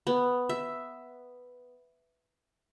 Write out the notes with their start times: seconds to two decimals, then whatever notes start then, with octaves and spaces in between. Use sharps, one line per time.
0.07 B3
0.49 E5